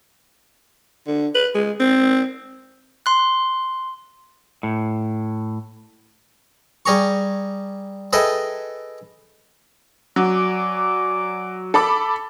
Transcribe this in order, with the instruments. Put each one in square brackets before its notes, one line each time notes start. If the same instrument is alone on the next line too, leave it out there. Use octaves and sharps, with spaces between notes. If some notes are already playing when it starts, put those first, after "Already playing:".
[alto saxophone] D3
B4
G#3
C4
[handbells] C6 F#6
[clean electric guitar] A2
[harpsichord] G3 G#4 A#5 C#6
G#4 A4 B4 D#5 E5 G5
[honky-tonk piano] F#3 [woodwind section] D5 G#5 D6
[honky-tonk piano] A4 B5 D6